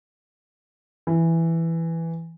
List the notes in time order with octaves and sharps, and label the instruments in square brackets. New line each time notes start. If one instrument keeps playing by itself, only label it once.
[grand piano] E3